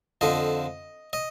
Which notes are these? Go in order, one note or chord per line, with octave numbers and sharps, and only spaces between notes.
F2 D3 F3 D#5
D#5